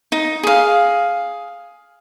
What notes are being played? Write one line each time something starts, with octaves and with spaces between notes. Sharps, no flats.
D#4
G#4 F5